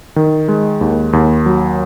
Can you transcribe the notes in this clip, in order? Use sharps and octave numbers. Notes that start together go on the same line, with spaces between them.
D#3
G#3
D#2
D#2
F#3